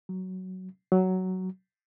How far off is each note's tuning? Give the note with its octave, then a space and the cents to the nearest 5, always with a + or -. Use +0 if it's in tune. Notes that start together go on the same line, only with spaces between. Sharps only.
F#3 +10
F#3 +10